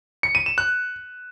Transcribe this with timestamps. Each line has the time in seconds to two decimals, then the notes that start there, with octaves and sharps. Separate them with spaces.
0.23 C#7
0.35 D#7
0.46 E7
0.58 F#6